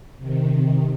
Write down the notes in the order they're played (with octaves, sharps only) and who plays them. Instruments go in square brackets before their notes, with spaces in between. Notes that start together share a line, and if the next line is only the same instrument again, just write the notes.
[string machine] C3 D#3